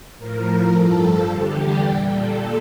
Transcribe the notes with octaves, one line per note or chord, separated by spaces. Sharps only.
A2 F3 A#4
G2 F3 A4
E2 D3 G3 G4
A#2 G3
A4